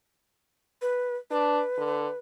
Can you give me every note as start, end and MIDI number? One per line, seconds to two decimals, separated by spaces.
0.82 1.16 71
1.31 1.60 62
1.31 2.18 71
1.78 2.07 50